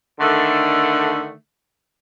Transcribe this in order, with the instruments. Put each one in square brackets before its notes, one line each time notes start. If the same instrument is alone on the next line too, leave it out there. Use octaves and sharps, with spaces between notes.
[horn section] D3 D#3 A3